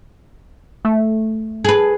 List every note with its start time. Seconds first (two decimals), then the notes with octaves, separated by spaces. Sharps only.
0.85 A3
1.65 G#4 B4